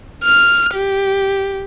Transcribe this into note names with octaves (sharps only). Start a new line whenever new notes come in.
F6
G4